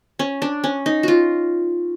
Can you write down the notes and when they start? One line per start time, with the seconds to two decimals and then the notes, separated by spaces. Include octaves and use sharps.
0.19 C#4
0.42 D4
0.64 C#4
0.86 D#4
1.03 F4 F#4